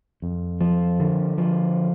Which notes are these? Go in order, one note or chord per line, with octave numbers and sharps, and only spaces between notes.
F2
F3
D3
F3